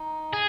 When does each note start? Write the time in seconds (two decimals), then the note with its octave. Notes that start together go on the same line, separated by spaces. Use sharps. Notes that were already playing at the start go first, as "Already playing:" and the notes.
Already playing: D#4
0.33 G#4 G#5